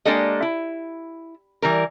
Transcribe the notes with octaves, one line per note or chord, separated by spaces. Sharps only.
G#3 A#3 D4 G4 A4 D#5
E4
E3 G3 A#4